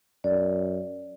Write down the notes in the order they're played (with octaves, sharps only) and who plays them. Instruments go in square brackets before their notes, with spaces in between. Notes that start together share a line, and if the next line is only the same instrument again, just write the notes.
[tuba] F#2 [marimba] D5